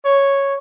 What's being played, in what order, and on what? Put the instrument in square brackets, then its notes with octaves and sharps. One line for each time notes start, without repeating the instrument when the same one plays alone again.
[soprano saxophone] C#5